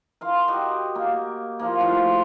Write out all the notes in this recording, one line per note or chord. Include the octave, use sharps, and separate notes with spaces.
A#4 F5 C6
F#4 G4 D#5
A#3 A#4
F3 A#3
A2 F3 F4 F#4